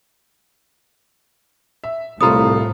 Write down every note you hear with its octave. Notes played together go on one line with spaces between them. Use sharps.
E5
C2 A2 A3 F4 A#5 B5 D#6